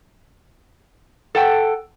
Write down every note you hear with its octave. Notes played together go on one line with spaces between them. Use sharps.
A4 F#5 G5